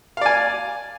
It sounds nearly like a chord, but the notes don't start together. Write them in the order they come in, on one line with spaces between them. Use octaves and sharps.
F5 D5 G#5